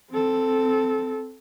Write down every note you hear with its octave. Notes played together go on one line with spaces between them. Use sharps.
C4 A4